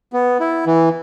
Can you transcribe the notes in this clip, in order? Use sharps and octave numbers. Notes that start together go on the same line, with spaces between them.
B3
E4
E3